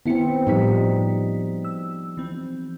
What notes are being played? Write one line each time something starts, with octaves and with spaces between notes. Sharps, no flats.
D#3 B3 C4 E4 C#7
A2 F3 G3 D#4 F#4 B6
E6
E3 C4